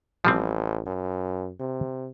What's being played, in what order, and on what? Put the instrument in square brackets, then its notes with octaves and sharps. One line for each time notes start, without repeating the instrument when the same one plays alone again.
[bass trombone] A1 [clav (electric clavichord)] F3 G3 C4
[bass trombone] F#2
C3